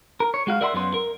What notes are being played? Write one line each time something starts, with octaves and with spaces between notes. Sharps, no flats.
A#4
C#5
G#3 F#4 F5
A#4 D5 E5 F#5 A#5 C6
F#2 F#3 B3 C6
A#4